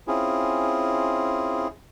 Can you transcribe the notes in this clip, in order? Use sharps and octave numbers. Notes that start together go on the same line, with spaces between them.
C4 C#4 E4 F4 G#4